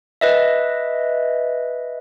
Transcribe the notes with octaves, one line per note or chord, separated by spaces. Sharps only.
B4 D#5 E5